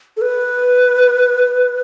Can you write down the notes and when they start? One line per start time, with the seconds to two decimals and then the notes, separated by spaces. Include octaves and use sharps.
0.17 A4
0.21 B4